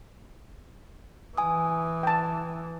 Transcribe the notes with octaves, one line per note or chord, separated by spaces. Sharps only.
E3 G#5 D#6
G5 A5